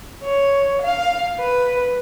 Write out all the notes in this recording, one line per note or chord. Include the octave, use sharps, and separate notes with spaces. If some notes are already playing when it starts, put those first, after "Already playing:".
C#5
F5
B4